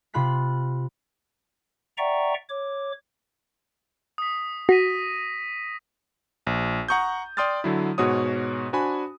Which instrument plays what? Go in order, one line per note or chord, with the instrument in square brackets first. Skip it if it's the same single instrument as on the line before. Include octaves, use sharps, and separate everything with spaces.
[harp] C3 F4 B5 F#6 B6
[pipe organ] D5 E5 F#5 G5 A#5 C#6
C#5 D6
[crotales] D#6 B6
[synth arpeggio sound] F#4 [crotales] A#6 B6 D#7
[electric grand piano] A#1
F#5 A#5 C#6 D#6 G6
D5 G5 C6 D#6 F6 A6
D3 F#3 E4
G#2 B2 F#4 G#4 C#5 D#6
D4 F#4 C5 G#5 B5